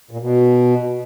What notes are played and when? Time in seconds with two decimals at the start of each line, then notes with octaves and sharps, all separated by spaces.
0.11 A#2
0.21 B2